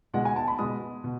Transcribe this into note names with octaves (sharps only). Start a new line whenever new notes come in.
B2 G#3 F#5
G#5
A5
B5
B2 G#3 D#6
B2